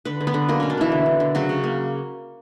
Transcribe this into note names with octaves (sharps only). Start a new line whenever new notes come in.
D3 B4
D3
B3 B4
D3
F#3 A#3 A#4
B2 C#4
D4
E3 A#3 E4
D3
D3
D3
C#3 F#3 F#4
C#3
A#3